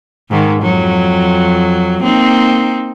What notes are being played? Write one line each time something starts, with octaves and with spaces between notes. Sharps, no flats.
G#2 D#3
F2 F#3
A#3 C4 D#4